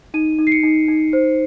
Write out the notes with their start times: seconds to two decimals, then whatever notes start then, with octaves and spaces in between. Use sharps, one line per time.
0.14 D#4 D#7
0.39 D#4
0.47 C7
0.52 C#7
0.63 D#4
0.88 D#4
1.13 C5